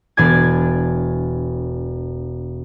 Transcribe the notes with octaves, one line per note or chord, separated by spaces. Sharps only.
E1 D4 D5 G#5 G#6